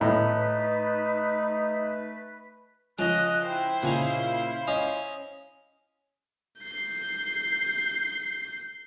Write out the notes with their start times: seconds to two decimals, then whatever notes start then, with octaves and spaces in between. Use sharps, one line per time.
0.01 A2 A3 D#4 B4
2.99 C#3 F3 D#5 F#6
3.45 E4 C5 G5
3.83 A#2 C#3 D#4 G#4 F5 F#5
4.67 C#4 D#5
6.61 G6 C7